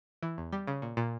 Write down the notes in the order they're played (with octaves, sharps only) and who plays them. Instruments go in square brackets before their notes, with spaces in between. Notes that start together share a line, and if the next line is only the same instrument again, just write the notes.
[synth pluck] E3
E2
G3
C#3
A#2
A#2